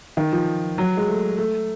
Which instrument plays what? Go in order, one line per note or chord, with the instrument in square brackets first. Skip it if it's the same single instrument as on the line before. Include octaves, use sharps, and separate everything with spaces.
[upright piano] D#3
F3
F#3
G#3
A3
A3